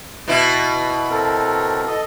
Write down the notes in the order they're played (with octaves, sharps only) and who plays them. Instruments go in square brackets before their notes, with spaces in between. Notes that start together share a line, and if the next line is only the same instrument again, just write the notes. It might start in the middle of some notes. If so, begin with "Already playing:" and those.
[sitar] B2 E4
[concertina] C4 A4 A#4
A4 D#5